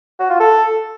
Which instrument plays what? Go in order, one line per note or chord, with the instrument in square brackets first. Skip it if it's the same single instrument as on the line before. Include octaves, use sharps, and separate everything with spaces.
[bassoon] F#4
F4
A4